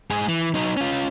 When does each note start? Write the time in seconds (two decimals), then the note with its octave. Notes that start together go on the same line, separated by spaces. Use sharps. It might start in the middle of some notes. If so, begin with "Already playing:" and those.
0.11 G#2 G#4
0.28 E3
0.54 F#3 D#4
0.77 C#4 F4